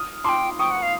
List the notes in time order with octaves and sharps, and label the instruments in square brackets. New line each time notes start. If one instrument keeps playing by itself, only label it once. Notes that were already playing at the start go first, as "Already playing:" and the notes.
Already playing: [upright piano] D#6 F6
[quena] A5 [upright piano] C6 D6
[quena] G5
[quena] G5 [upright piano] C#6 D#6
[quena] F#5
F5